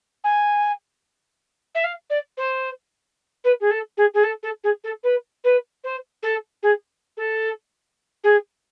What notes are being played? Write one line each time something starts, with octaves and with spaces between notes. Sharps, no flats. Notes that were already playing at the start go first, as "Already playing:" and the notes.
G#5
E5
F5
D5
C5
B4
G#4
A4
G#4
G#4
A4
A4
G#4
A4
B4
B4
C5
A4
G#4
A4
G#4